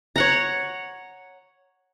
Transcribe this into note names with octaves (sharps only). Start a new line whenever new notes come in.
C#5 F#5 A#5